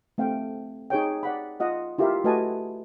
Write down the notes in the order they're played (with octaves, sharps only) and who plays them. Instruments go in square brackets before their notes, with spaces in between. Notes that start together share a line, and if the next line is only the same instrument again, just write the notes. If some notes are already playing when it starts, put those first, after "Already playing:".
[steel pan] A3 C4 F5 G5
D#4 G#4 C#5 G5
D5 F#5 B5
F4 D#5 F#5
E4 F4 G4 A#4 E5 F5
A3 F#4 B4 D#5 G#5 A5